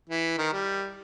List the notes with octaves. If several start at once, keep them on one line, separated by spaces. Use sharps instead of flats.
E3
D#3
G3